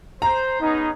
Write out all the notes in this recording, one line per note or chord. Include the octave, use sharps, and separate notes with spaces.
C5 A#5
B3 C#4 D#4 G#4